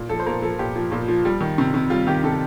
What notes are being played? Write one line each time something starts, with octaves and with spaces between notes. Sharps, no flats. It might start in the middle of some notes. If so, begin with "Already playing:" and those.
Already playing: A#2
F3 A4
C5
A#2 A#4
F3 A4
A#2 G4
F3
A#2
F3
G3
D#3
C3
C3
G3 F4
D#3 G4
C3 A4